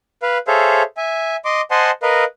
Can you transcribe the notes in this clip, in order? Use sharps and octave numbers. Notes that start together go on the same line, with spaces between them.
B4 F5
G#4 A4 C5 C#5 E5 F5
E5 G#5
D#5 C6 D6
C5 D#5 F#5 G#5 A5 C6
A#4 B4 D#5 F5